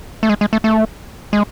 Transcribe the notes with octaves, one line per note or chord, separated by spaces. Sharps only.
A3
G#3
G#3
A3
A3
G#3